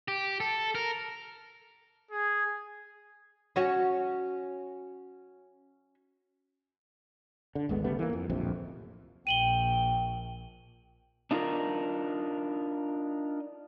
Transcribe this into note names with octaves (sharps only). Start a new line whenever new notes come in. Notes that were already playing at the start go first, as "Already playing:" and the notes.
G4
A4
A#4
G#4
C#4 F#4 C#5
D3
G#1 D2 G#3 B3
C#3 G3 A3 B3
E3 A#3
F2
D1 A#1 F2 C3
A#1 G5 D#7 F#7 G7
D4 D#4 F4 G#4 A#4